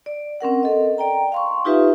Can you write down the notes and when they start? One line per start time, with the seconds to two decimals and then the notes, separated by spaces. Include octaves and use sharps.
0.06 D5
0.40 C4 C#4 A#4 F#5
0.63 A4 D#5
0.98 D5 G5 A#5
1.32 F5 C6 C#6
1.65 D#4 F4 G4 B4 E5